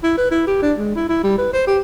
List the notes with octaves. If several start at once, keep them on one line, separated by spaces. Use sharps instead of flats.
E4
B4
E4
G4
D4
G#3
E4
E4
G3
B4
C5
G4